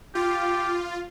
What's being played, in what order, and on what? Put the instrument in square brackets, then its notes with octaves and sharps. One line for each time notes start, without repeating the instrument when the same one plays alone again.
[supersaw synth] F4 [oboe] G4